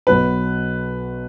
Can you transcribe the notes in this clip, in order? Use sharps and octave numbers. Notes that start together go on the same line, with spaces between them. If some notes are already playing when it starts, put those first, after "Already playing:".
B1 B2 F#3 B3 B4